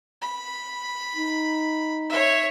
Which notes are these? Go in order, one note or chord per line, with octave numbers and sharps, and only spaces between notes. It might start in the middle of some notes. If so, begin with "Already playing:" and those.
B5
D#4
C#5 E5